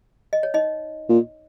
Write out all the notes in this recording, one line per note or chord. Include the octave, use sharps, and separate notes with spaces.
D#5
C#5
D#4 D#5
A#2